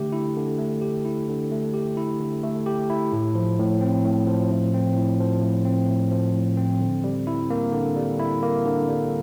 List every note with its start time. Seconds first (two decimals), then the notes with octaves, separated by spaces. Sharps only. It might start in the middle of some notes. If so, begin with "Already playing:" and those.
Already playing: D3 A3 G4
0.12 E4
0.36 D3
0.58 A3
0.81 G4
1.05 E4
1.28 D3
1.51 A3
1.74 G4
1.97 E4
2.20 D3
2.43 A3
2.66 G4
2.90 E4
3.13 A2
3.35 F3
3.59 A2
3.81 C4
4.04 A2
4.27 F3
4.51 A2
4.74 C4
4.97 A2
5.20 F3
5.42 A2
5.65 C4
5.89 A2
6.11 F3
6.34 A2
6.57 C4
6.81 D3
7.04 G3
7.27 E4
7.50 A#3
7.72 D3
7.96 G3
8.19 E4
8.43 A#3
8.66 D3
8.89 G3